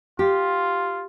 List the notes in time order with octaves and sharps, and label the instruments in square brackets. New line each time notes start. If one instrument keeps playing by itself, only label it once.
[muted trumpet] F4 [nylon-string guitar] G4